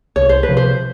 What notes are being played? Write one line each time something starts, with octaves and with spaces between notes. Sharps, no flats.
C2 C#5
C5
B4
C3 F3
C5